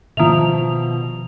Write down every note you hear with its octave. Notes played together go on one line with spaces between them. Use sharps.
B2 D#3 F3 E5 F7